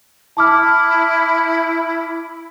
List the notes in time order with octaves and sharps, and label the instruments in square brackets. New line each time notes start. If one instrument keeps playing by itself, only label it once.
[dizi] E4 [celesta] A5 D6 F6